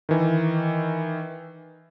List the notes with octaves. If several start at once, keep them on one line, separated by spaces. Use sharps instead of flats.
D#3 E3